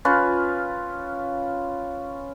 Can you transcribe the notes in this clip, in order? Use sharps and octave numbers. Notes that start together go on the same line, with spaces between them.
C#4 F4 B4